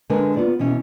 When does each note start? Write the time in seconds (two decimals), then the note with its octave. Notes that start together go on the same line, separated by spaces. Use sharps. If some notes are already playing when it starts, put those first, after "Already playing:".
0.10 D3 G#3 A#4 B4 G#5
0.36 B3 F4 B4 D5
0.59 B2 E3 C#4